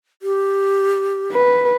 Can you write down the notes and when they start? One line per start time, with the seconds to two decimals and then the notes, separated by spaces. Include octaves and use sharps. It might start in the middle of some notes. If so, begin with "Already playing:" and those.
0.22 G4
1.32 B4